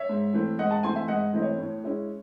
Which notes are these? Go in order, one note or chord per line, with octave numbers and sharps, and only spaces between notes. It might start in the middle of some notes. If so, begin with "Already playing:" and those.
Already playing: C#5 E5
G#2
E3 A3 C4
G#2 D#5 F#5
F#5 A5
E3 A3 C4 G#5 C6
E5 G#5
G#2 D#5 F#5
E3 A3 C4 D#5
C#5
A2
G#3 C#4 E4